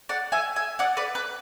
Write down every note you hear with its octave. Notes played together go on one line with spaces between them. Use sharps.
D5 F#5
E5 G#5
E5 G#5
D5 F#5
B4 D5
B4